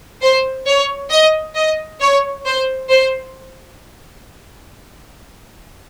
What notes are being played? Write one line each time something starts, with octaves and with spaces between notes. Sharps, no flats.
C5
C#5
D#5
D#5
C#5
C5
C5